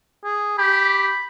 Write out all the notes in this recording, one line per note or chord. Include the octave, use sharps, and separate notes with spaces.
G#4
G4 B5